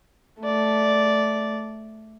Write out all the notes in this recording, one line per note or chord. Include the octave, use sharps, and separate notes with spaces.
A3 D5